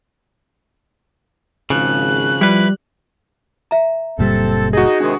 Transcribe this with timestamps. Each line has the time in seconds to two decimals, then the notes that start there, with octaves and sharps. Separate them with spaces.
1.70 G#1 C#3 F3 F#6
2.41 F3 G3 E4 B4
3.71 E5 A#5
4.19 F#1 A#2 G3 C4 A4
4.73 D#4 F#4 G#4 D#5
5.01 C3 D#3 G#3 D4